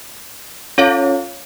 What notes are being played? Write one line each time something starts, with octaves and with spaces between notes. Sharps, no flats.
C#4 F4 A4 C#5 F5